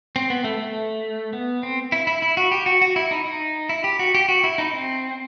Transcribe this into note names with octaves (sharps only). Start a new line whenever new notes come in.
C4
B3
A3
A3
B3
C4
E4
E4
E4
F#4
G4
F#4
F#4
E4
D#4
D#4
E4
G4
F#4
G4
F#4
E4
D#4
C4